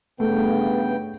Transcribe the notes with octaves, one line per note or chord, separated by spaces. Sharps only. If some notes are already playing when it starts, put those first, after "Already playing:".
G2 C#3 A3 B3 G5